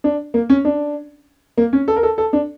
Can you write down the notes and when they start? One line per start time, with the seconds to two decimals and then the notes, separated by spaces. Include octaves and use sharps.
0.04 D4
0.34 A#3
0.50 C#4
0.65 D4
1.57 A#3
1.73 C#4
1.88 A4
1.96 A#4
2.03 A4
2.18 A4
2.33 D4